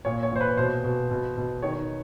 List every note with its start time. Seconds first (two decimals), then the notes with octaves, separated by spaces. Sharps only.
0.05 A#2 C#5
0.23 C#5
0.32 A#2 C5
0.41 B4
0.57 B2 C5
0.84 B2
1.11 B2
1.37 B2
1.63 D#3 C#5